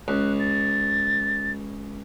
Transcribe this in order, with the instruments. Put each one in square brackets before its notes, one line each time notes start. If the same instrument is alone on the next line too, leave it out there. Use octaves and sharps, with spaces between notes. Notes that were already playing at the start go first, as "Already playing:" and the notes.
[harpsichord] C#2 [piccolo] F#6
[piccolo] A6